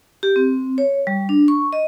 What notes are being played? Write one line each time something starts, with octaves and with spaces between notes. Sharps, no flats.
G4
C4
C#5
G3
D4
C#6
D#5